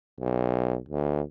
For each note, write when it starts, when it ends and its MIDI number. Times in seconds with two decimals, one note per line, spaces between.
0.20 0.77 35
0.89 1.21 38